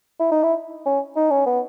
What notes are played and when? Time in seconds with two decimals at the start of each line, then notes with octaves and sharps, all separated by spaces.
0.20 E4
0.32 D#4
0.43 E4
0.86 C#4
1.16 D#4
1.31 C#4
1.46 B3